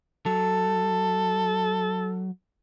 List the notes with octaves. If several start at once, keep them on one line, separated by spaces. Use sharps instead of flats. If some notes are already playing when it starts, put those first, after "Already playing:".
F#3 A4